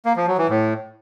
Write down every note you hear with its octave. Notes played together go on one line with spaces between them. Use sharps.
A#3
F3
F#3
E3
A2